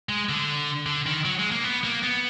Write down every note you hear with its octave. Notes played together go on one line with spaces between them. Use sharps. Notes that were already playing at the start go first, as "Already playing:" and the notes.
G#3
D3
D3
D#3
F#3
G#3
A#3
B3
A#3
B3